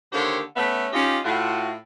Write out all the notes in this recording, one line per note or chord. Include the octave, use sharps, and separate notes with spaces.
D3 D#3 A#3 G4 C5 C#5
A3 B3 C#4 E5
C#4 D#4 F4 G4
A2 F4 F#4